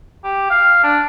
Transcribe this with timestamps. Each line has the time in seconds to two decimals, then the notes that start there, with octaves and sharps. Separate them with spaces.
0.24 G4
0.50 F5
0.83 D4